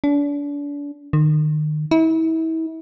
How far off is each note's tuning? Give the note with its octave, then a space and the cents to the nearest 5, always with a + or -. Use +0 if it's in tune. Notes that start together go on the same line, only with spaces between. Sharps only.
D4 -35
D#3 -35
E4 -35